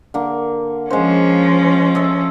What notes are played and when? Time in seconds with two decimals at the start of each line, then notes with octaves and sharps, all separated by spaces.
0.14 D3 A#3
0.90 F3 G#3 C#4 C5
1.95 A4 D#5 E5